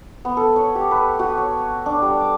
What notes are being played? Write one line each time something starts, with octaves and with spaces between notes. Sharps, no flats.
B3
A4
C#5
G4
B4
F#4
C#5
D4
G3
D6